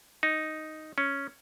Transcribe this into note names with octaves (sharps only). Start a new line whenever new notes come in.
D#4
C#4